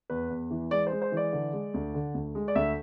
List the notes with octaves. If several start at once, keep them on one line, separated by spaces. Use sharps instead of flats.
E2 B4
E2
E3
G#3 D5
C5
G#3
C5
E3 D5
D3
G#3
D2
D3
D2
G#3
D5
D2 E5